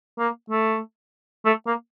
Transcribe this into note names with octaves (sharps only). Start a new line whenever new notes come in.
A#3
A3
A3
A#3